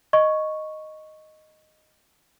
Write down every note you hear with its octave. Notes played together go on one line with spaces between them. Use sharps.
D#5 C#6